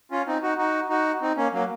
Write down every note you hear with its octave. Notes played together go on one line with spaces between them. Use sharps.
C#4 F4
C4 D#4
D#4 F#4
D#4 F#4
D#4 F#4
C4 D#4
A#3 C#4
F#3 A#3